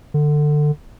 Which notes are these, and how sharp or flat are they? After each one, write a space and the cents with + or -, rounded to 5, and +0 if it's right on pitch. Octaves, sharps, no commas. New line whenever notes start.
D3 +20